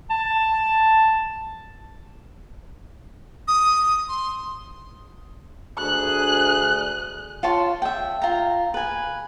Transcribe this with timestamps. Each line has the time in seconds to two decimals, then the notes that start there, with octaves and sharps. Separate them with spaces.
0.10 A5
3.48 D#6
4.09 C6
5.79 D2 G#4 F#6
7.43 F4 C#5 A5 C6
7.82 E5 G5
8.22 F4 A#5
8.74 B4 G#5